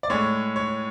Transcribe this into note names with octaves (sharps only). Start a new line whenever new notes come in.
D5
A2 G#3 C#5
C#5